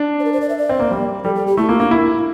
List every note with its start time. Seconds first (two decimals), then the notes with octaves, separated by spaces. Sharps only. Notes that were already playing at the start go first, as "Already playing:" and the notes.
Already playing: D4
0.20 C5
0.25 A#4
0.33 C5
0.41 D5
0.49 E5
0.58 D5
0.69 C4
0.80 A#3
0.91 G3
1.24 G3 A4
1.35 A4
1.47 G4
1.57 A3 E4
1.69 A#3 F4
1.80 A#3 D4
1.91 E4